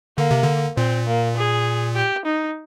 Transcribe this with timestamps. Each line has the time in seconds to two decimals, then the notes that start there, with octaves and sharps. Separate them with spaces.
0.18 D3 A#3
0.31 C3
0.43 D3
0.77 A#2 C4
1.07 A#3
1.37 G#4
1.96 G4
2.25 D#4